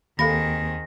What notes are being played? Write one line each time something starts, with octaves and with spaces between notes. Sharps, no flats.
D#2 D#3 C4 G#4 A4 F5 B5 A#6